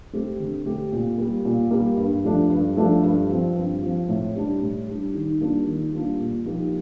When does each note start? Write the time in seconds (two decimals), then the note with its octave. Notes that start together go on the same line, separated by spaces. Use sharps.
0.13 A3 C4 G4
0.39 D3
0.65 A3 C4 G4
0.92 A#2
1.18 G3 A#3
1.45 A#2
1.71 G3 A#3
1.97 G2
2.24 F3 A3 D4
2.50 G2
2.77 F3 A3 D4
3.02 G2
3.29 F3 C4
3.55 G2
3.82 F3 C4
4.09 A2
4.35 G3 D4
4.61 A2
4.88 G3 D4
5.14 D#3
5.40 G3 A#3 D4 F4
5.66 D#3
5.92 G3 A#3 D4 F4
6.19 A#2
6.45 F3 A#3 D#4 G4